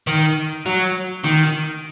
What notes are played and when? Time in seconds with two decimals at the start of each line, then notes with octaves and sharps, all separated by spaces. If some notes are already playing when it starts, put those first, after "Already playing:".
0.07 D#3
0.66 F#3
1.24 D#3